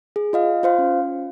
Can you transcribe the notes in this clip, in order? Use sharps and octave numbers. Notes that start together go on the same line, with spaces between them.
G#4
F4 D#5 F5
F4 C5 F5
C#4